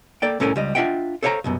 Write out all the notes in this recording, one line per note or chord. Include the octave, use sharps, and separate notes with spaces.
A#3 A4 D5 G5
C2 A2 C#4 A4 A#4 G#5
C#2 G3 D#5
D4 F4 D#5 E5 F#5 G5
A4 C5 C#5 F5 F#5 A#5
C2 F#2 B2